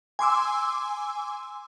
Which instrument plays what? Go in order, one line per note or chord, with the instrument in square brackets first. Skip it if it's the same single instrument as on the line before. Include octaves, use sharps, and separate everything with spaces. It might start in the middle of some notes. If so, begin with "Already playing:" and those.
[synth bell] G#5 C6 D6 E6